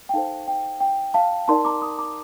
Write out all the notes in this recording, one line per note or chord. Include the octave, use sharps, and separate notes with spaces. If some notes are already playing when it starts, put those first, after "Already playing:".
G5
D#4 A4 C5 F5 A5
G5
G5
F5 A5
D#4 A#4 D5 A5 C6
A#5 D6
C6 D#6
A#5 D6